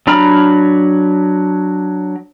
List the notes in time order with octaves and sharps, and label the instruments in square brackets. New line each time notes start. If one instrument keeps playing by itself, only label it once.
[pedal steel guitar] F#3 D4 A#5 B5 F6